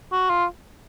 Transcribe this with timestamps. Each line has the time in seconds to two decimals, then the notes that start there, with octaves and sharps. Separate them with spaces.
0.12 F#4
0.29 F4